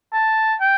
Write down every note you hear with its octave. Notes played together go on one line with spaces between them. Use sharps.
A5
G5